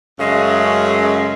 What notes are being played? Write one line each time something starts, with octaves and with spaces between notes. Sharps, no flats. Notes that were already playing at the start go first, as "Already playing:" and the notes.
F#2 C#3 G#3 A3